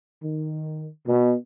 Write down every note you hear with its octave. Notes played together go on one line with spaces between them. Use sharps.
D#3
B2